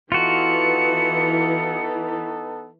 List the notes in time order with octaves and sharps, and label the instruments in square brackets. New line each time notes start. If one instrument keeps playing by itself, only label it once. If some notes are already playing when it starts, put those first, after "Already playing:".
[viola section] E3 [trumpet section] B3 D#4 A4 [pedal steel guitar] F4 F#4 [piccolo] C#7